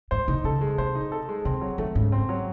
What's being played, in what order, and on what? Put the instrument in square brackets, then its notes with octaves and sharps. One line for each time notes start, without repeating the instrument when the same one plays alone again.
[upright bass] G#2 [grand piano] C5
[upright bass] C3 [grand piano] D#4
[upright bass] C#3 [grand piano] A4
[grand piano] G#3
[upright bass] C3 [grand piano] C5
[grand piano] D#4
A4
G#3
[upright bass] C3 [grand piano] C4
[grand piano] F#3
[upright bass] D#3 [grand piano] A3
[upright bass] G#2 [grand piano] C#3
[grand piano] C4
F#3